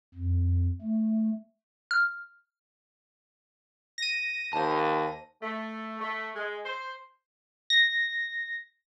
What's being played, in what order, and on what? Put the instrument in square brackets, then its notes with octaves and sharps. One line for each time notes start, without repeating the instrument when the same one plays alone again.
[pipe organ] F2
A3
[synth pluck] F6
[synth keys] A#6 D#7
[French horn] D#2 [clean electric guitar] C5 A5
[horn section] A3
A3
G#3
C5
[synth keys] A#6